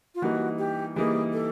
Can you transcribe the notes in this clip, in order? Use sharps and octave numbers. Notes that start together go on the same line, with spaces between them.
F4
E3 G3 A#3 D#4 F#4
G4
E3 G3 A#3 D#4 G#4
A4